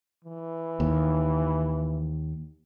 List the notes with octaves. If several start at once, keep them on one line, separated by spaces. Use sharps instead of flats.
E3
D#2